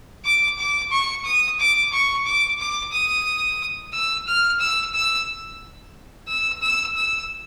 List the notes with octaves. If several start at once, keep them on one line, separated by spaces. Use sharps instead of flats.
D6
D6
C#6
D#6
D6
C#6
D6
D6
D#6
E6
F6
E6
E6
E6
E6
E6